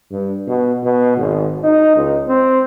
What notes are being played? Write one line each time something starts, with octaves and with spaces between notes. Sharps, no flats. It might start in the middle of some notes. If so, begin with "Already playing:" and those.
G2
B2
B2
G#1
D#4
C#2
C4